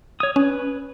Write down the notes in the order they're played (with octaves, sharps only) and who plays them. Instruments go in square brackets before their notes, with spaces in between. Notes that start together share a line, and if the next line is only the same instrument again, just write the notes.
[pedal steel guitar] C#5 D#6
[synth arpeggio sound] C#4 [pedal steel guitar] B4